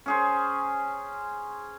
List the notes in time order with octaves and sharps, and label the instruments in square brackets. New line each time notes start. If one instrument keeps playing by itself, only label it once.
[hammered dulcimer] C#4 G#4 C5